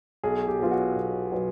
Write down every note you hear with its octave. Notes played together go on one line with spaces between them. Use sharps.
B1 G#4
G4
B2 F#3 B3 F4
F#4
B1
B2 F#3 B3